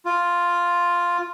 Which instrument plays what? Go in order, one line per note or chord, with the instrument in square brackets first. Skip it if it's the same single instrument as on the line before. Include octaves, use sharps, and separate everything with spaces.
[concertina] F4